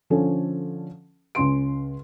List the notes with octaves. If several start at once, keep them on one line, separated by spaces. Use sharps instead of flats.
D3 F3 C#4 A4
C#2 C#4 C6 D7